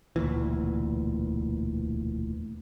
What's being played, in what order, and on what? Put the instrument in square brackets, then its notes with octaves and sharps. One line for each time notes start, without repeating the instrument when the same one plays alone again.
[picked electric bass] E1 D2 A#2 E3